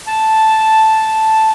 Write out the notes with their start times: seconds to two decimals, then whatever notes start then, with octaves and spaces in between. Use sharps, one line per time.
0.07 A5